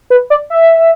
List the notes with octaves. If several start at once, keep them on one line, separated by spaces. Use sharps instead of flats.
B4
D5
E5